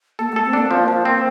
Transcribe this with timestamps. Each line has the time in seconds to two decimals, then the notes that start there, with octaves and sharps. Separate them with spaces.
0.19 A#3 A4
0.32 A3 A4
0.45 C4
0.53 A#3 D4
0.71 F3 A#3
0.88 F3
1.05 C4